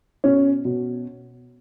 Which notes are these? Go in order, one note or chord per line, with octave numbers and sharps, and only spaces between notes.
B2 C#4
B2